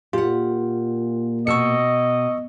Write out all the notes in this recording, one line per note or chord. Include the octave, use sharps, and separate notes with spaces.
A#2 F4 G4 F#5
B2 D#5 C#6 E6 C#7